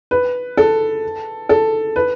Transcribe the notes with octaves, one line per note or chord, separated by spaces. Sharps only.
B4
A4
A4
B4